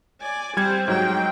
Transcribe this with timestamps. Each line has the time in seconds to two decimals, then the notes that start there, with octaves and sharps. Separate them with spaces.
0.21 D5 G#5
0.57 G3 C4 C5 G#6
0.88 G#2 F#3 G5